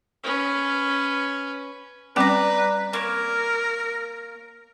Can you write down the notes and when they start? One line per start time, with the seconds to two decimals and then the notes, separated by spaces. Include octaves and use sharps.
0.24 C#4 B4
2.16 G3 C4 C#4 B4 D5 A#5
2.93 A#3 A#4 C#5